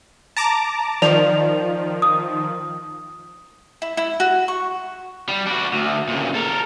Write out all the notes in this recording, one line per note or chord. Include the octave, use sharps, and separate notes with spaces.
A5 A#5 D6
D#3 F3 D5 F7
D#6
E4
E4
F#4
C#6
G3
D4 F#4
D2
A#2 C#3
A4 A#4